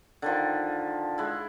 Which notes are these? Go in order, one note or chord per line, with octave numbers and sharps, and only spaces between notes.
D3 D#3 F3
G#3 E4